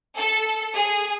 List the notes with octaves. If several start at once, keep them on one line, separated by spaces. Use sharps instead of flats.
A4
G#4